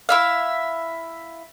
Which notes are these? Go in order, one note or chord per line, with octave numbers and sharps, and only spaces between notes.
E4 E5 F5